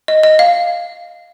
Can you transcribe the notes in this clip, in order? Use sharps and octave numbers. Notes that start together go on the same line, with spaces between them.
D#5
D#5
F5